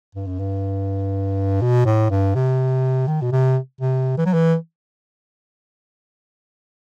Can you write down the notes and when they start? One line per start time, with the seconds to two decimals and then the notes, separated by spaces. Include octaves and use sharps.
0.15 G2
0.27 F#2
0.39 G2
1.62 B2
1.85 A2
2.10 G2
2.35 C3
3.08 D#3
3.22 B2
3.32 C3
3.81 C3
4.18 E3
4.26 F#3
4.33 E3